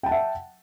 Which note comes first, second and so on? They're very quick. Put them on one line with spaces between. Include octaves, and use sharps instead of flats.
G5 A5 F#5 E5